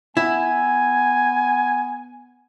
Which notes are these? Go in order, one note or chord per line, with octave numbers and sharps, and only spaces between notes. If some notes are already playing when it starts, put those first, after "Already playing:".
B3 E4 G#5